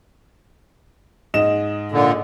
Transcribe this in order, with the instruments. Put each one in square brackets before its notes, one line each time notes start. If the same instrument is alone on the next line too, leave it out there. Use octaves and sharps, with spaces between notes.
[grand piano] G#2 D#5 E7
[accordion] A#2 D3